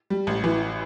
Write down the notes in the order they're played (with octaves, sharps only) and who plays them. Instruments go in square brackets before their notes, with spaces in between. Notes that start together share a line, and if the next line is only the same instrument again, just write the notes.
[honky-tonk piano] G3
A1
E3